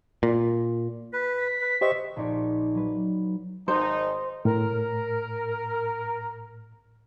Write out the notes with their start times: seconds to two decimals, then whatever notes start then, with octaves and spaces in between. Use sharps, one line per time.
0.23 A#2
1.13 B4 B6
1.37 B6
1.61 B4
1.81 G4 C5 D#5 E5 C#6
2.16 A#1 A#2 D#4 D5 C#6
2.75 F#3 B4
3.68 G#1 D#4 C5
4.45 A2 A#4